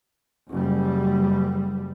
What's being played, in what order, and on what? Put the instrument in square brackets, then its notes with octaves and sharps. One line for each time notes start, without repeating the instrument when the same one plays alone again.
[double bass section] F#1 G3